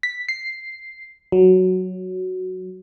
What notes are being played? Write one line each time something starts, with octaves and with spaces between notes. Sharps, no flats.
B6
C7
F#3